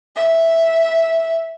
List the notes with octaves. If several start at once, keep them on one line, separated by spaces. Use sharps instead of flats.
E5